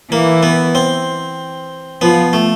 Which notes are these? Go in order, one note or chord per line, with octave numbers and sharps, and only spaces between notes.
E3 A#3 E4
B3
C4
F3 B3 F4
A3